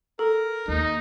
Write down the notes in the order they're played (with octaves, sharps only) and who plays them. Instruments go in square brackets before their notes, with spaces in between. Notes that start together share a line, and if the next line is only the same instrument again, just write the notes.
[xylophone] A4 [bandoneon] A#4
[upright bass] D#2 [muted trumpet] D#4